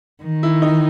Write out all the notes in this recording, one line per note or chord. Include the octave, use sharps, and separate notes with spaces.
D#3
E4
D#4